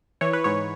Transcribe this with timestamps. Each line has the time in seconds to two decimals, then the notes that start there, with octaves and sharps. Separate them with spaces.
0.21 E3 C#5
0.33 B4
0.44 G#2 C#5